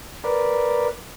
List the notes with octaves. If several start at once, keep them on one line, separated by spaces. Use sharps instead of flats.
A#4 B4 D5